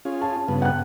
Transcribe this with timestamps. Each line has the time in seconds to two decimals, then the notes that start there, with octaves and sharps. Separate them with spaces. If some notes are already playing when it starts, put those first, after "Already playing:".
0.05 C#4 F4 G#4
0.22 A5
0.48 G2 C#3 B3
0.62 F#5 G5 F#6